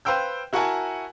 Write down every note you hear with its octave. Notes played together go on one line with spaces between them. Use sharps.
B4 C5 F5 G5 E6 G6
E4 F#4 A#4 F#5 G#5 A5